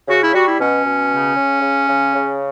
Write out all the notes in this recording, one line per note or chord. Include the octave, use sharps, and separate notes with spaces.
C#3 F#4
E4
G3 F#4
E4
B2 C#4
B2
C#3
C#3
C#3
C#3
C#3